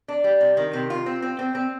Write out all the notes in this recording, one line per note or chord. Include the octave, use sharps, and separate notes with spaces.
D4
G3
C3
D#3
C3
F4
C4
C4
C4
C4